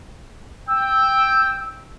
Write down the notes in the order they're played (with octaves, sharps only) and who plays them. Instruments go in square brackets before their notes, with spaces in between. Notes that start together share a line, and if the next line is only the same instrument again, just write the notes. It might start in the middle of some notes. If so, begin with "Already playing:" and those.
[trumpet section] G5 [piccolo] E6